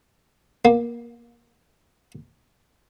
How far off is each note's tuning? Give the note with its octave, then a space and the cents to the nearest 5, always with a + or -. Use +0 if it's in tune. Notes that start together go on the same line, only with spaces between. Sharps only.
A#3 +20